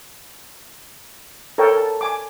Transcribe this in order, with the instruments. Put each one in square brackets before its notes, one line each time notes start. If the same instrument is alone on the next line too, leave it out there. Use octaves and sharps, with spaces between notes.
[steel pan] A4 A#4 C#5 G5
A5
G#5 D6